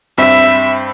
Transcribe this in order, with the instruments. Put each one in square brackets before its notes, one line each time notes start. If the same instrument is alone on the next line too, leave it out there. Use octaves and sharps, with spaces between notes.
[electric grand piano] G2 C4 B5 [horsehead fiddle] E5